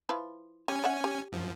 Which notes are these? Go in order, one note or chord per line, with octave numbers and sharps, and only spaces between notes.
F3 E4 B4
G3 C#4 G#5
D5 E5 F#5
G4
F#2 F3